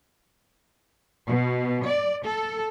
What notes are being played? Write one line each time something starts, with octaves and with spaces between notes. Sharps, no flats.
B2
D5
A4